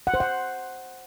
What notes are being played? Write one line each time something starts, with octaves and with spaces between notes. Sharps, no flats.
F#5
C5
F#5